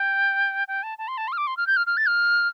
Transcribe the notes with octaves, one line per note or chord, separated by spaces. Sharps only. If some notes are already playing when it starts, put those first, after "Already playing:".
Already playing: G5
G5
A5
A5
C6
A5
C6
F6
D6
C6
F6
G6
F6
F6
A6
F6